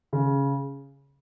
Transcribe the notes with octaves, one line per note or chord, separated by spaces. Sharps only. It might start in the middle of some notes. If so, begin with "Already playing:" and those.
C#3